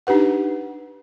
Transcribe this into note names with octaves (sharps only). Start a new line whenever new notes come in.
D4 D#4 G4 B4 F#5